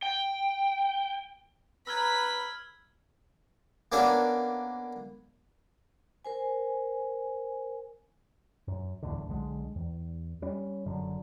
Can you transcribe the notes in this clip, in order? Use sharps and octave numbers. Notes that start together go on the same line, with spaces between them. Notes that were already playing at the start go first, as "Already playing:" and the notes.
G5
B4 A#5 B5 E6 F6 G#6 B6
A#3 B3 C#4 D4 A4
A#4 C5 G#5
F#2
D1 E2 A2 D3
B1 D3 G#3
E2
G3 C#4
F#1 F#2 D3